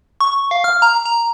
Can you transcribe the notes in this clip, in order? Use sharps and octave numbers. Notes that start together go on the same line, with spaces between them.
C#6
F5
F6
A#5
A#5